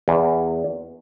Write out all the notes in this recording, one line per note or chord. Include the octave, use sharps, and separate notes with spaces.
E2